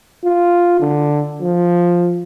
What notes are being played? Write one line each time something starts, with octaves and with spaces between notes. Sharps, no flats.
F4
D3
F3